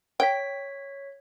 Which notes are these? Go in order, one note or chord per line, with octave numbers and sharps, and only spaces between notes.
C#5 G5 B6